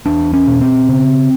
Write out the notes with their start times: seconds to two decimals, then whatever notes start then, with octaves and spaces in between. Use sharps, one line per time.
0.06 E2 D4
0.33 C#4
0.47 B2
0.61 C4
0.89 C#3